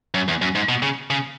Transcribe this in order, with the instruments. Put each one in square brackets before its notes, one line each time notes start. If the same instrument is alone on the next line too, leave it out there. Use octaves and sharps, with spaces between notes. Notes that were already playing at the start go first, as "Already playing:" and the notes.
[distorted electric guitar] F#2
E2
F#2
G#2
B2
C#3
C#3